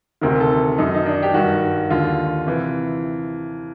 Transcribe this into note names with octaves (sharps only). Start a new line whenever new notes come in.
D2 C3 D#3 A#4
A4
F#2 D#3 D#4
D#4
D4
G4
G2 D#3 F#4
D#2 D3 F4
C3 E3